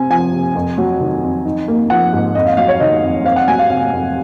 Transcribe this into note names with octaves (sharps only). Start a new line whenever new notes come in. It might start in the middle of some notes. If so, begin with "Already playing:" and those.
Already playing: C3 C4 G#5
F3 G#5
C3
F2
F#3
D#3
F2
D#4
A#3
F3 F#5
G#2
F2 D#5
F5
F#3 F5
C#5
D#3 D#5
F2
C4 F5
F#5
F#3 G#5
F5
C3 F5
F2